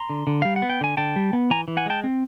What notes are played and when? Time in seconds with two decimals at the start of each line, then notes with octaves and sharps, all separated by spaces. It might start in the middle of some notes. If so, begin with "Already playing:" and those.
Already playing: A#5 C6
0.10 D3
0.27 D3
0.42 G3 F5
0.56 F#5
0.62 B3
0.70 G5
0.81 D3 G#5
0.97 D3 G5 A5
1.16 G3
1.33 B3
1.50 E3 G#5 A#5
1.68 E3
1.77 F#5 G#5
1.86 G#3 G5 A5
2.04 C4